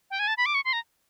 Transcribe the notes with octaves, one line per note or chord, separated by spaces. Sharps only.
G5
G#5
A5
B5
D6
C#6
C6
A#5